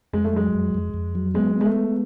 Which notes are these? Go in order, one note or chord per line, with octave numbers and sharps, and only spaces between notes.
F2 G#3
A3
F#3 G#3
F2
F2
F2
F#3
G#3 B3
B3
G#3
A3
G#3